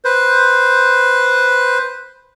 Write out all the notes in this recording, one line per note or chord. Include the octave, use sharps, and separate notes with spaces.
B4 C5